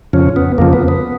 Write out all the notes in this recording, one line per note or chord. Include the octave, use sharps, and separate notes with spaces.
F2 C#3 F3 C#4
B3
F2 C#3 F3 A#3
B3
B3